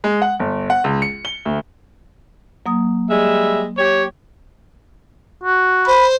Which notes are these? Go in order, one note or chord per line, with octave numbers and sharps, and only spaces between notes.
G#3
F#5
G1
F#5
C#2
C#7
G7
D2
F#3 A#3 D#6
G3 G#3 E5
G4 C#5
F#4
C5 B5